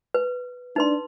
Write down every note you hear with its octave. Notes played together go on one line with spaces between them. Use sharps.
B4
D4 D#4 B4 C6